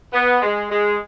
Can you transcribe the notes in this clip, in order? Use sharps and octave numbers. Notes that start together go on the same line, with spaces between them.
B3
G#3
G#3